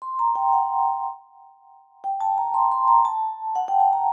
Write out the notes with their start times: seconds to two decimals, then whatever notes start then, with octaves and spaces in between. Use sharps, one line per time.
0.02 C6
0.19 A#5
0.35 G5
0.53 F#5
2.04 G5
2.21 A5
2.38 A#5
2.54 C6
2.72 C6
2.88 A#5
3.05 A5
3.55 F#5
3.68 G5
3.80 A5
3.93 A#5